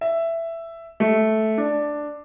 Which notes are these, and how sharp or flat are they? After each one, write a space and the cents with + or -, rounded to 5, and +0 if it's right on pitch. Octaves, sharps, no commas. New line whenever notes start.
E5 +10
A3 -10
D4 +5